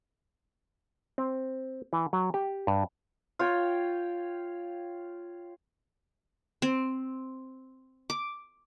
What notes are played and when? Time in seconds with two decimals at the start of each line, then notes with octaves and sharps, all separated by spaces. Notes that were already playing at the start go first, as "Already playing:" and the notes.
1.18 C4
1.93 E3
2.13 F#3
2.34 G4
2.67 G2
3.39 F4 C#5 G5
6.62 C4
8.10 D6